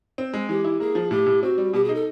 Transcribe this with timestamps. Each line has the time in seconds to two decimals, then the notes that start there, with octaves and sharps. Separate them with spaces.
0.18 C4
0.34 G#3
0.49 E3 G4
0.64 E4
0.80 A#3 G#4
0.95 F3
1.11 A2 G4
1.26 A2
1.42 C4 F#4
1.58 G3
1.73 B2 G4
1.84 G#4
1.89 D#4
1.94 A4